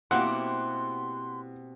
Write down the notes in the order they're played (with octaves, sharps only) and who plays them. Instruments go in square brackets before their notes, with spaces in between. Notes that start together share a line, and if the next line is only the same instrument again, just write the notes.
[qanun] B2 A#3 E4 [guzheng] C4 G4 [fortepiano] F#5 [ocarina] C6